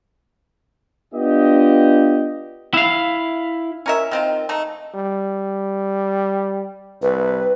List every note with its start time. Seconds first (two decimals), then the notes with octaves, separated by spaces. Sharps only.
1.14 B3 D4 F4 G4 D#5
2.74 E4 F5
3.86 C#4 A#4 E5
4.11 D#3 C4 F4
4.49 A3 D#4
4.95 G3
7.02 C2 B4